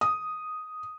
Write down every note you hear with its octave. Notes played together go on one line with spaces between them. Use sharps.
D#6